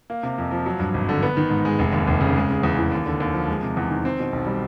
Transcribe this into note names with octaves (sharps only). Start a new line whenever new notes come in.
A#3
C3
F2
F3
F#3
G2
G#1
D3
B3
D#3
G#2
G#3
F1
D#2
F1
C#3
G#3
C#3
E2
E3
D#2
D3
D#2
F3
G#3
C3
E2
D#3
C4
B2
B1
G3